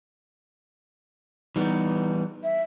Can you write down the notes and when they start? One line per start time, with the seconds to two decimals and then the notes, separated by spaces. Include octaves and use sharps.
1.56 E3 G3 B3 D#4
2.43 E5